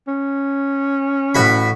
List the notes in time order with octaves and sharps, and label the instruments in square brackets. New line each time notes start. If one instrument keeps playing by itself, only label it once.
[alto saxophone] C#4
[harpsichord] A1 F#4 B5